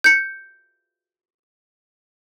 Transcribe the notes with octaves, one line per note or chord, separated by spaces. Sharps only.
G6 C#7